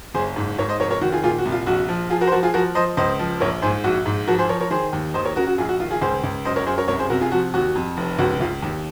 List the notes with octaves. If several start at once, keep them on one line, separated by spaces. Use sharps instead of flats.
F#1 G#4 C5
G#2
G#2 A#4 C#5
C5 D#5
F1 A#4 C#5
A#4 C#5
D#3 F#4
F4 G#4
A#2 F4 G#4
F#4
C2
F4
A#1 F#4
F3
F3 F4 G#4
F#4 A#4
C5
F3 F#4 A#4
F4 G#4
F3 F#4 A#4
F3 C5 D#5
C#2 C5 D#5
F3
A#1 A#4 C#5
G#2 G#4 C5
A#1 F#4
G#2
F3 F#4 A#4
G#4 C5
F3 A#4 C#5
A#4 C#5
D#3 G#4 C5
D#2
D#2 C5 D#5
A#4 C#5
C#3 F#4 A#4
F#4
A#1 F4 G#4
F#4
D#3 F4
F4 G#4
C#2 G#4 C5
C#2
F#2 C5 D#5
A#4 C#5
F#2 G#4 C5
A#4 C#5
C2 A#4 C#5
G#4 C5
C3 F#4 A#4
F4 G#4
F3 F#4
D#2 F#4
F2
F1
C#2 F#4
C#2 F4
D#2